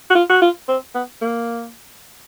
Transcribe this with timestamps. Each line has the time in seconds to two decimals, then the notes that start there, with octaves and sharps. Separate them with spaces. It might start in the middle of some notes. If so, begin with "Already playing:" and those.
0.10 F#4
0.15 F4
0.30 F#4
0.42 F4
0.69 C4
0.95 B3
1.22 A#3